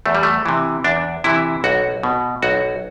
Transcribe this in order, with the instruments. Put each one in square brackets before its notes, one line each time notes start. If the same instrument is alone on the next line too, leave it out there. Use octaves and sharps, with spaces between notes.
[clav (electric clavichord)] E2 A3
G3
A3
C3 E3
E2 D4
C3 E3 E4
B1 F#4
B2
B1 F#4